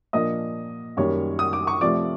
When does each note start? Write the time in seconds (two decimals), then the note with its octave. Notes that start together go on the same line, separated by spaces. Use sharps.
0.13 A#2 F3 A#3 D4 D#5 D#6
0.97 F#2 D#3 G3 A#3 C#5 C#6
1.39 D#6
1.53 D6
1.67 C#6
1.81 C3 F3 A3 D5 D6